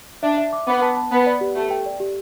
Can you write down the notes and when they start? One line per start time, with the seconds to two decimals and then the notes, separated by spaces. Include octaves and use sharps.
0.23 D4 E5
0.38 E5
0.53 D6
0.67 B3 D6
0.82 A5
0.97 A5
1.12 B3 B5
1.26 D5
1.41 G4
1.56 A3 G4
1.71 G5
1.86 D5
2.00 G4